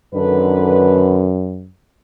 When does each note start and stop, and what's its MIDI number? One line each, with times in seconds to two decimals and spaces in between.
0.14 1.70 42
0.14 1.31 50
0.14 1.31 51
0.14 1.31 71